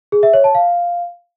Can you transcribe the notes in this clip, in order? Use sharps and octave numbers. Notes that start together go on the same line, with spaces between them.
G#4
E5
C#5
A5
F5